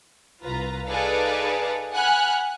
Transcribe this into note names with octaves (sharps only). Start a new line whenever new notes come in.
C2 F4 B4 A#5
D#4 G#4 A4 B4 D5 F5
F#5 G#5 B5 F6 F#6